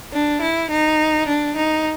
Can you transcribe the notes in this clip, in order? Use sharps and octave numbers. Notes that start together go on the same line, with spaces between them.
D4
E4
D#4
D4
D#4